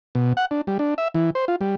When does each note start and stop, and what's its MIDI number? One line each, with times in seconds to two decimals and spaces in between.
0.15 0.33 47
0.37 0.45 78
0.51 0.61 62
0.67 0.78 55
0.79 0.94 62
0.98 1.08 76
1.14 1.30 52
1.35 1.45 72
1.48 1.56 65
1.61 1.75 55